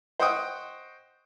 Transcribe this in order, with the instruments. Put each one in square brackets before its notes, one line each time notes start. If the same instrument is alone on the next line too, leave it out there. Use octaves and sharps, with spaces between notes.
[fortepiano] C5 D#5 F#5 G5 C#6 D#6